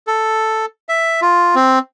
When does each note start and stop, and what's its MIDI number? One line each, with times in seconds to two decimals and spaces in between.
0.07 0.65 69
0.89 1.20 76
1.22 1.55 65
1.55 1.79 60